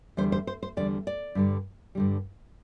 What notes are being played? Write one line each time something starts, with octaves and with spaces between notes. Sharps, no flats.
E2 D3 G3 C5
C5
C5
C5
E2 D3 G3 D5
D5
G2 D3 G3
G2 D3 G3